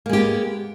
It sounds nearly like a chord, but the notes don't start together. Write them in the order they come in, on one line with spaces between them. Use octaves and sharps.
A#3 G#3 G4 B3